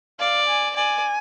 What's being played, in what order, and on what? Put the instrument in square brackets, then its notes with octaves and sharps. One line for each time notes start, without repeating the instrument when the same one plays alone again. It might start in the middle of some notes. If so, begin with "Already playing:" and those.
[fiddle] D5 [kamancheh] F5
[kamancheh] G#5
[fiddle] D5 [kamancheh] G#5